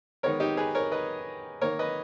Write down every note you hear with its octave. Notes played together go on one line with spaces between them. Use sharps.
D#3 G#3 B3 A#4 C#5
D#4 G4
G#4 B4
A#4 C#5
B4 D#5
D#3 A#3 A#4 C#5
B4 D#5